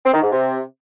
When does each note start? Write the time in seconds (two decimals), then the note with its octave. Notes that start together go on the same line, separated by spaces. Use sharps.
0.05 C4
0.14 D#3
0.22 G#2
0.31 C3